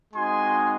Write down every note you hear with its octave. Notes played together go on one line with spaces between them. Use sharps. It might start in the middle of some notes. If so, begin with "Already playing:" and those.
G#3 C4 D#4 F#4 G#5 C6